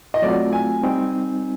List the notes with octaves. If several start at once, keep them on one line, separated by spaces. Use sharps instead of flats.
D#5
F#3 A3 C4 F4 D5
G#5
G3 C4 D#4